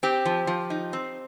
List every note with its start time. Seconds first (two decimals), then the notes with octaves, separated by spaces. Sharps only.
0.03 C4 G4
0.25 F3
0.47 F3
0.70 D#4
0.93 C4